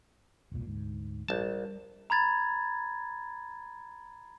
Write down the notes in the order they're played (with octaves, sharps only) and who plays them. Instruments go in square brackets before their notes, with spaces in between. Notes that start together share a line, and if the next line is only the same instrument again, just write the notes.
[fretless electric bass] E1 C2 A#2
D2 G#2
[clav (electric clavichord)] A#1 A5 [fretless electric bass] G3
[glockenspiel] A#5 B5 G#6 A6